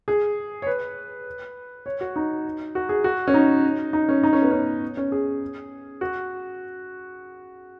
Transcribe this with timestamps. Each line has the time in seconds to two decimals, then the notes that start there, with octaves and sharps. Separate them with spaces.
0.08 G#4
0.62 C#5
0.67 B4
1.86 C#5
2.01 F#4
2.16 D#4
2.75 F#4
2.89 G#4
3.04 F#4
3.28 C#4
3.34 D#4
3.93 D#4
4.09 C#4
4.23 D#4
4.33 C#4
4.42 B3
4.51 C#4
4.97 C#4
5.12 G#4
6.01 F#4